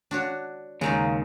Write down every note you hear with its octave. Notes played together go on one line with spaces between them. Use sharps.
D4 F#4 C#5
D#2 C#3 G#3 D#4 F4